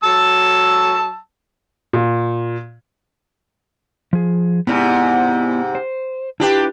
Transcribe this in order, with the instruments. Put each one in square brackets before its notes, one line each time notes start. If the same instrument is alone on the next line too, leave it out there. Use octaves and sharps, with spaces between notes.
[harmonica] F#3 A5 E6
[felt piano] A#2
[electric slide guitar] F3 G#4
[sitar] G#2 C3 [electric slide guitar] B3 E4 D5
[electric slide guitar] C5
[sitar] D4 G4 [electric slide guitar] E4 F4 B4